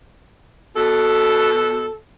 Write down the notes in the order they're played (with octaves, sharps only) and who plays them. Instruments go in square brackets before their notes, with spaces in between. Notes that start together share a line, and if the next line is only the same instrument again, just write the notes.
[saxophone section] B2 A4